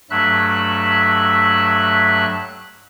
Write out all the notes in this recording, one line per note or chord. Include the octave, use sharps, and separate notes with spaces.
G2 F#3 A3 E5 B5 F#6